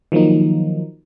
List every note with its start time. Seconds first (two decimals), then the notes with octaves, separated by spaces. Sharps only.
0.12 D#3 F3 F#3 A#3 D#4